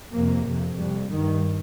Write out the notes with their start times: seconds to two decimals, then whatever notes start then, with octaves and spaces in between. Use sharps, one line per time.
0.13 F2 C3 A#3
0.45 F2 C3
0.78 F2 G3
0.83 C3
1.10 G2 D#3